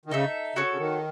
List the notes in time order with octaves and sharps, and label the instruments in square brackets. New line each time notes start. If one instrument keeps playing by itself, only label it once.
[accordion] D#3
[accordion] C#3 [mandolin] D#4 A4 E5
[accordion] C#3 [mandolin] F#4 A4 C#5
[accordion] C#3
D#3